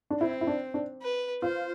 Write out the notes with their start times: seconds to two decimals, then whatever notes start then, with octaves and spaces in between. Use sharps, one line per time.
0.10 D4
0.20 C4 E4
0.41 E4
0.47 D4
0.74 D4
1.02 B4
1.42 F4 C5